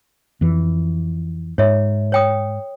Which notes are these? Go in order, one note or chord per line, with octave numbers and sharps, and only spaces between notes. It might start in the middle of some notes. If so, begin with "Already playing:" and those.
F2 E3
G#2 C#5 E5
C#5 G5 D#6